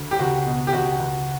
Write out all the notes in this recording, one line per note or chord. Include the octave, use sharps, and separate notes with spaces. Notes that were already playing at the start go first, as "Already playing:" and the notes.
Already playing: D2
G4
C#2 F#4
B2
G4
C#2 F#4
C#2